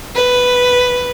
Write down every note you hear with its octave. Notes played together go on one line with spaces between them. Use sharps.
B4